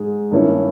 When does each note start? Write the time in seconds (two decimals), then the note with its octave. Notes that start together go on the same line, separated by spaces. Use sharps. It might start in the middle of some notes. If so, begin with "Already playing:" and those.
Already playing: G#2 G#3
0.31 G2 D#3 A#3 C#4 E4